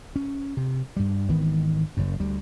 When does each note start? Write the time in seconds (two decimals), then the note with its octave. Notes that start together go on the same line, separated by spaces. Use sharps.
0.16 C#4
0.57 C3
0.97 G2 G3
1.29 G#1 D#3 E3 B3
1.97 F#1 F#2
2.20 D2 G3